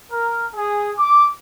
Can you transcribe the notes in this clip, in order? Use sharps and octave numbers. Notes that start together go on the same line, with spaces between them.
A#4
G#4
D6